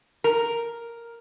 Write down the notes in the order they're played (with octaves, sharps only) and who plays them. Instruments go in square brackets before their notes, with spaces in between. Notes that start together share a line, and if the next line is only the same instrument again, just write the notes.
[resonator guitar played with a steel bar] A#4